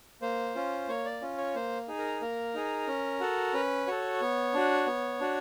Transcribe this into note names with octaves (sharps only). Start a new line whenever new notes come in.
A#3 C5
C#4 F4
A#3 C#5
D5
C#4 F4
C#5
A#3 C5
D#4 G#4
A#4
A#3 A#4
D#4 G#4
C#4
F#4 A4
C#4 B4
F#4 A4 C#5
B3
D4 F#4
B3
D4 F#4